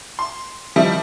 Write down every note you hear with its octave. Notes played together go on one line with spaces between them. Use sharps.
C6
D#3 F3 G3 D#4 E4